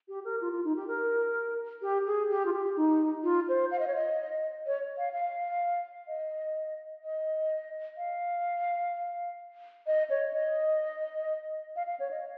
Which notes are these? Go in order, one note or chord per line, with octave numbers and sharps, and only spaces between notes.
G4
A#4
F4
F4
D#4
G4
A#4
G4
G#4
G4
F4
G4
D#4
F4
C5
F5
D#5
C#5
D#5
C#5
F5
F5
D#5
D#5
F5
D#5
C#5
D#5
F5
F5
C#5
D#5